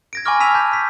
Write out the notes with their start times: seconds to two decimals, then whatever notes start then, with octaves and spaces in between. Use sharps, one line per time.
0.13 G#6 A#6 D7
0.25 G#5 B5 C#6 D6 F6 A#6
0.40 A5 E6 B6 D#7 F7
0.55 A5 G6
0.73 B6